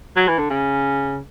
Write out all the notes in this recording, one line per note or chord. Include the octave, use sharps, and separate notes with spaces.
F#3
E3
D3
C#3